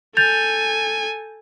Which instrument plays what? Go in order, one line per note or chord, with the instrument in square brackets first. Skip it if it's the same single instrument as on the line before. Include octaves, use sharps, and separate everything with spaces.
[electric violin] A4 G#5 [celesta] G6 A6 F7